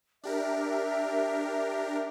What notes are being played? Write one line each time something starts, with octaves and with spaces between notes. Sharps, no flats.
D4 G4 A#4 E5